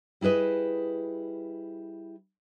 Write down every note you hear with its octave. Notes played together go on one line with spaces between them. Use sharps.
G3 E4 G#4 B4 D#5